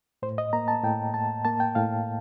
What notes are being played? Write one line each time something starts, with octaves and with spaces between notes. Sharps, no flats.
A2 C5
D#5
A#3 A#5
A5
A2 G5
A2 A5
A#3 A5
G5
A2 F5